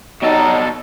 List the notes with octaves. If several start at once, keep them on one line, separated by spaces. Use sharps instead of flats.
B2 F#3 G3 D#4 A4